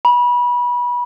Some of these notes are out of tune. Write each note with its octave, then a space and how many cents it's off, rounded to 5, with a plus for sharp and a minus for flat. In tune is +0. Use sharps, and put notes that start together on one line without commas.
B5 -25